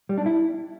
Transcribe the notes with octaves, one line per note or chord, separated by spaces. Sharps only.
G3
D4
E4